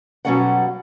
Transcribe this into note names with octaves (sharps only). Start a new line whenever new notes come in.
B2 F#3 G3 C#4 A4 F#5